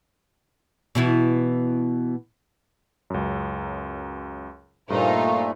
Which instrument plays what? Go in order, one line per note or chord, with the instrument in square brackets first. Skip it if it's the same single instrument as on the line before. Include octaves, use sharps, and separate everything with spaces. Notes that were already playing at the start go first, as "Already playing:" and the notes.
[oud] B2 E3 E4
[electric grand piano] C#2 F#2
[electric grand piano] G2 [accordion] A#2 A3 [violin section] D#4 F4 C5